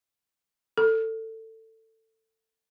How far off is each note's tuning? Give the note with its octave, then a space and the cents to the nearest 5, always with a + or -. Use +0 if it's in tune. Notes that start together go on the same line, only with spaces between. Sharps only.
A4 +20